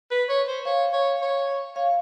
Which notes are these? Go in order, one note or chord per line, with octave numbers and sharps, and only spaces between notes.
B4
C#5
C5
C#5 F5
C#5
C#5
C#5 F5